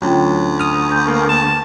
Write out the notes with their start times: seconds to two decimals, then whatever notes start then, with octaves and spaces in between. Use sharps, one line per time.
0.02 D2 F#3 C#4 F4 G5
0.60 D#6 F6
0.91 G6
1.07 A#3
1.29 A5